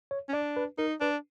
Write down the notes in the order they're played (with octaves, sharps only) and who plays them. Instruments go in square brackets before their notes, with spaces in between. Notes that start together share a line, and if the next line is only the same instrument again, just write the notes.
[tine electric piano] C#5
[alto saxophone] C#4
[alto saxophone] D4 [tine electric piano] D5
[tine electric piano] B4
[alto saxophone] D#4 [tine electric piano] A#4
[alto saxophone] D4 [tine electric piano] B4